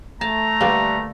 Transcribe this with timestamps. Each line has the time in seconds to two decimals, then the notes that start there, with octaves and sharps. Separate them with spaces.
0.21 A3 A5 A#5
0.61 D3 G3 A#3 B4